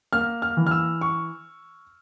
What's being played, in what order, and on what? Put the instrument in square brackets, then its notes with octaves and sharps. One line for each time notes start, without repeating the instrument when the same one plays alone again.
[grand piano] A#3 F6
F6
E3
F6
E6
C#6